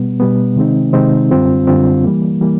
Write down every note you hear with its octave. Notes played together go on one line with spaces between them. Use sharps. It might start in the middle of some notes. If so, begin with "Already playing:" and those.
Already playing: B2 G3 B3
B2 G3 B3
C3 D#3 G#3 C4 D#4
C3 D#3 G#3 C4 D#4
F#2 D3 G3 C4 F4
F#2 D3 G3 C4 F4
E3 G3 A#3
E3 G3 A#3